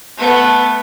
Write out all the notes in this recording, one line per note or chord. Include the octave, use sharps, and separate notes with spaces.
A3 B3